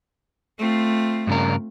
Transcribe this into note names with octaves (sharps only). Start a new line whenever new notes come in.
A3 C4 F4
G2 C#3 A#4